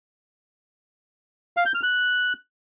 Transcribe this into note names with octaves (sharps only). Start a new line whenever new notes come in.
F5
G6
F6
F#6